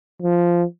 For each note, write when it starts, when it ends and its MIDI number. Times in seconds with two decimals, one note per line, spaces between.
0.22 0.63 53